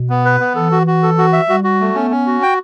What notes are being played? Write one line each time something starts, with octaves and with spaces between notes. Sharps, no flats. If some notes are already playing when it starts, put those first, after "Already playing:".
Already playing: B2
B3
B4
B3
E3 A4
F#4
F#4
A4
F#4
E5
G3 F#4
F#4
A3
B3 C#4
C#4
F#4
G5